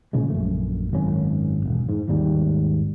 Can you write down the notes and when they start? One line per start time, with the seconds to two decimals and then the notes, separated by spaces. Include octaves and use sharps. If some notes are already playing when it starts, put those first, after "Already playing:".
0.13 A#2 C#3 F3 G#3
0.30 A#1 F#2 A3
0.93 G#1 F#2 C#4
1.66 E1
1.89 G#2
2.08 G#1 D#2 G#2 G3